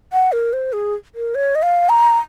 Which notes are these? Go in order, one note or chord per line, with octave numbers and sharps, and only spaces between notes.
F#5
A#4
C5
G#4
A#4
C#5
D#5
F5
A#5